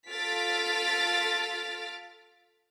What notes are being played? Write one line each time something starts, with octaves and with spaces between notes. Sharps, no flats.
F4 A4 F6 A6 B6 D7